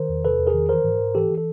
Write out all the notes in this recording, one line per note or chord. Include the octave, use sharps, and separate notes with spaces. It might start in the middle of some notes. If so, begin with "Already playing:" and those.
Already playing: D#3 A#4 C5
E2
C3 A4 B4
E2
G#4 A#4
D#3
E3 A#4 C5
G#2
G#2
E3 G4 A4
E3
A4